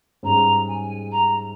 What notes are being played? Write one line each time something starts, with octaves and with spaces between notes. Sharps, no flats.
G#2 G3 C#4 G#4 A#5
G#5
A#5